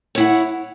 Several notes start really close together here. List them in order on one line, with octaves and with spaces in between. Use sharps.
C#5 E4 F#5